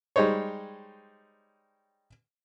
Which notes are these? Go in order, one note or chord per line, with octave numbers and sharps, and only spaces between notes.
G3 G#3 D#4 C5 C#5